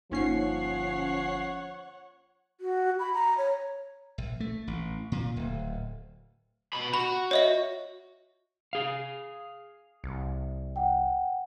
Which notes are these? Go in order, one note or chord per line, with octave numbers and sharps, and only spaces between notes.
G1 F3 A#3 C#4 D#4 C#5 F#5 C7
F#4
B5
A#5
C#5
A#1
A3
A1
A#2
D1
B2 B5
F#4 B5
C#5 D#5 E5
G#4 F5
C2
F#5 G5